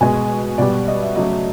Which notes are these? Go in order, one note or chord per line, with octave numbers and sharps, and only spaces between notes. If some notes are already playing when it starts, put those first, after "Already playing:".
B2 G#3 G#5
B2 G3 D5
D#5
E5
C#3 F#3 A3 D#5